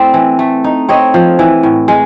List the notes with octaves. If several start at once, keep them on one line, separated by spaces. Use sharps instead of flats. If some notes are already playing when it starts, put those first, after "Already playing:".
Already playing: A3 C4 E4 D5 E5
E3
A3
D#4
C4 C#5 D#5
F3
E3
A2
G#3